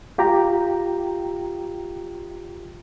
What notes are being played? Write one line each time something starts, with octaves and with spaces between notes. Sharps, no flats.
F4 G4 G5 A#5